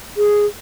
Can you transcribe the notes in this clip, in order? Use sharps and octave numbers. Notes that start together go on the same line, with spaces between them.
G#4